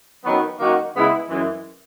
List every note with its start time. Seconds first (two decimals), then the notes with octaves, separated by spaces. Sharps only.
0.24 F#2 D#3 F#3 B3
0.59 F#2 D#3 A#3 D#4 F#4
0.94 C#3 G#3 B3 E4
1.29 F#2 E3 G#3